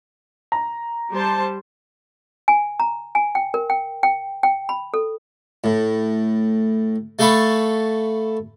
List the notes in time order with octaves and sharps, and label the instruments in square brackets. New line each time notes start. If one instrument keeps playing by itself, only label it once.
[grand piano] A#5
[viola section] G3 C5 A5
[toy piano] G#5
A#5
G#5
G5
A#4
G5
G5
G5
B5
A4
[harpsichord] A2
A3 A4 F5 A5 B5 C#6